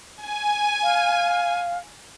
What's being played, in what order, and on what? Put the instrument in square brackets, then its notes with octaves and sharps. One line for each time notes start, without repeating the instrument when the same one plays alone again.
[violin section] G#5
[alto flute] F5